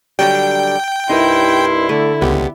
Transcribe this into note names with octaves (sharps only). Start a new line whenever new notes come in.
D3 F#3 G3 G5
C2 G2 D#4 E4 C6
D3 A3
C#2 B3 G4